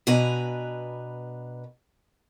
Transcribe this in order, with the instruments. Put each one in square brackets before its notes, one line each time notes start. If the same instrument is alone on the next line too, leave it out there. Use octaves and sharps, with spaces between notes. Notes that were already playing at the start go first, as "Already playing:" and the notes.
[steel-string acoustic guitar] B2 D4 B4 G#5 A#5